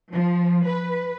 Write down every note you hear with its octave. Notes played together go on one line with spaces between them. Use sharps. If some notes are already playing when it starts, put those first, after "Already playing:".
F3
B4